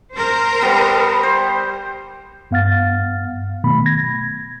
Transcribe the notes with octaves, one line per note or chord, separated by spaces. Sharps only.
A#4 C5
G3 B3
C5
G2 B3 F5 F#5 F6 A6
B2 D#3 F#3 A3 B3 B5
G#6 A#6